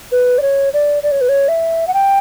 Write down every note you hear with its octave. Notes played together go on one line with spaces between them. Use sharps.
B4
D5
C#5
D5
D5
C#5
B4
C#5
E5
F#5
G5